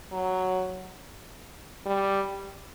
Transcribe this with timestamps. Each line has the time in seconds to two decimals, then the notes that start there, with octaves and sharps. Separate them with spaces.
0.12 F#3
1.86 G3